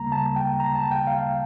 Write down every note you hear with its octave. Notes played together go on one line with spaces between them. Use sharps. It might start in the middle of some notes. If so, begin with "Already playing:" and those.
Already playing: D2 C#3 G3 A#3 A#5
A5
G5
A#5
A5
G5
F5